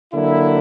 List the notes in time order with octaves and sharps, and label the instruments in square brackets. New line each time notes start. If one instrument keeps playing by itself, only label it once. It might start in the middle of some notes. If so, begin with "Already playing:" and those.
[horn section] D3 F#3 A#3 E4